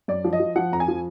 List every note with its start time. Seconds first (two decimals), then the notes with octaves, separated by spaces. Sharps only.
0.08 F#2 D5
0.25 F3
0.33 D#5
0.40 F3
0.56 F3 F#5
0.72 F2 A#5
0.80 G#5
0.88 F3